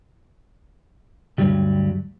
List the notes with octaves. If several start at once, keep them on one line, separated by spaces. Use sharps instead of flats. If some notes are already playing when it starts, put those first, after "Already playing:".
D2 G2 F#3 G3